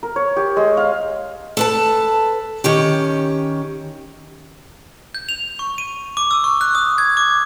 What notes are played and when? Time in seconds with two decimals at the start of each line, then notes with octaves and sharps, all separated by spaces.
0.03 A#4
0.16 C#5
0.36 G4
0.56 G#3
0.77 F5
1.57 A4 B4 A5
2.64 D#3 C#4 G4
5.15 G6
5.29 F7
5.59 C#6
5.78 D#7
6.17 D6
6.31 E6
6.44 C#6
6.61 F#6
6.75 D#6
6.98 G#6
7.17 D6